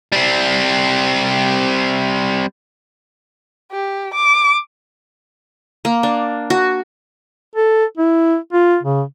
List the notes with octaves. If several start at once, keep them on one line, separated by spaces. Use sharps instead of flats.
G3 C4
G4
D6
A#3
D4
F#4
A4
E4
F4
C#3